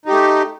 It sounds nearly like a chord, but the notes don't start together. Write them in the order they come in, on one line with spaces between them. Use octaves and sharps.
D#4 G4 A3